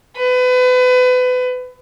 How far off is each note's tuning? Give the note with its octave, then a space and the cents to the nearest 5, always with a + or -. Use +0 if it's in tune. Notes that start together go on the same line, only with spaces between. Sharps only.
B4 +30